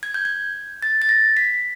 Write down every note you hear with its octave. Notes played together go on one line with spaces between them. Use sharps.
G#6
G6
G#6
A6
A6
A#6
B6